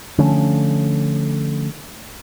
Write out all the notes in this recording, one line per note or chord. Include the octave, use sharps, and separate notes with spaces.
D3 F3 A3 C#4